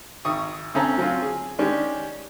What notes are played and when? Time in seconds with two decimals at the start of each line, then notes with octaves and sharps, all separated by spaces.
0.25 G#1 C#6 D#6
0.74 D2 C4 C#4 A4 A#5
0.98 F#3 C4 C#4 F4
1.22 G#4
1.59 D#3 G#3 C#4 D4 G4